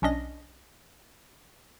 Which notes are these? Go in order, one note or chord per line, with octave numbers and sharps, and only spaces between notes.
B1 C#4 D4 D#5 A#6